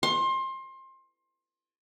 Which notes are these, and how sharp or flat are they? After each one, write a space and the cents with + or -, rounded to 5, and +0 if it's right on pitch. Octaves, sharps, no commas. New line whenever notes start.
C6 +25